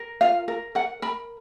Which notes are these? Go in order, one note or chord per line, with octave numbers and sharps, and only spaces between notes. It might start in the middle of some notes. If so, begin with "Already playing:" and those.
Already playing: A#4
F4 F5
A#4
A#4 F#5
A#4 B5